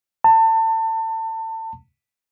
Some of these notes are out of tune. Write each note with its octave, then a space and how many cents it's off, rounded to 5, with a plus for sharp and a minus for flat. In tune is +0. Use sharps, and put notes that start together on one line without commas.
A5 +30